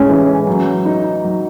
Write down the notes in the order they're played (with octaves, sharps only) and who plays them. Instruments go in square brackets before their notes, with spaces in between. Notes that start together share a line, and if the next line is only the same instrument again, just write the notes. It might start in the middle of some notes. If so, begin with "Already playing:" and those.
Already playing: [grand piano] A2 G#3 [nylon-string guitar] C#4
[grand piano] E3
F#3
D#4
F#3